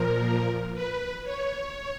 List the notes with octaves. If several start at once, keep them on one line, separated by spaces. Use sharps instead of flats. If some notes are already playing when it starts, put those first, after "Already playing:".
Already playing: A#2 F3 A#4
B4
C#5